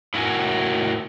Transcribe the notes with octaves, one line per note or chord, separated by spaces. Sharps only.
A2 E4 F#4 A#4 G#5